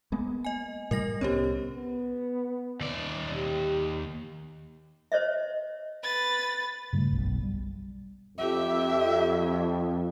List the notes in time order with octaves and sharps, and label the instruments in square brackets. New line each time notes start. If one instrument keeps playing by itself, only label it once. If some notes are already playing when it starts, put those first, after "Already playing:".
[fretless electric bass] G#3 A#3 B3
[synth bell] D#5 G#5
[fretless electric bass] A2 G3 [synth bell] A#4 D#5 A#6
[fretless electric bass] C2 B3 C#4 [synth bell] G4 C5 C#5
[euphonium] B3
[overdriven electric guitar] D#2 D5
[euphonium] G4
[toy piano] C5 C#5 D#5 E5
[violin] B4 A6
[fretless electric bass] G2 C#3 G3 A3
F#1 B1 F#2
G3
[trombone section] F2 [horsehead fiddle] G4 E5